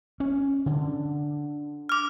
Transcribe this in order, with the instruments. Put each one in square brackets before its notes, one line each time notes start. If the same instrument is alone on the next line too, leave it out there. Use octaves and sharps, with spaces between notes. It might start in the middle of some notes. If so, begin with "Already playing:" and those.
[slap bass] C#4
D3
[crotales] D6 F6